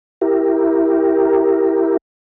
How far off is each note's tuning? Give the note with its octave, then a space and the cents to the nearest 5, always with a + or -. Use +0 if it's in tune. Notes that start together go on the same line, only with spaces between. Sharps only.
E4 +0 G4 +0 A#4 +0